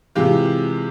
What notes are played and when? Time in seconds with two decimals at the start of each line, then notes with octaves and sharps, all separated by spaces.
0.15 C3 E3 G#3 F4 G4